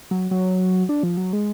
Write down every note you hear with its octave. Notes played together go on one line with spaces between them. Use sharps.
F#3
F#3
D4
F3
F#3
G#3